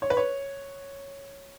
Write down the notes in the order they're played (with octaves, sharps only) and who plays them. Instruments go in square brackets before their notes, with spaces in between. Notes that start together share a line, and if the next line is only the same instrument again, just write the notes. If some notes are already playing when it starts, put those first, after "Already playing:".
[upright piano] C#5
B4
C#5